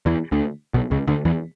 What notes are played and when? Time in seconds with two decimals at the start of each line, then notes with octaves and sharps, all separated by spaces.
0.06 E2 E3
0.32 D2 D3
0.74 B1 B2
0.91 C#2 C#3
1.07 D2 D3
1.25 E2 E3